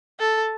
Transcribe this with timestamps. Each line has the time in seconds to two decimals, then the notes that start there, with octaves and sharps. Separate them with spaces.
0.20 A4